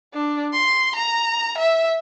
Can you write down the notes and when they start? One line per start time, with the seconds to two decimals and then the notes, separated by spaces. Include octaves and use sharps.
0.14 D4
0.53 C6
0.96 A#5
1.58 E5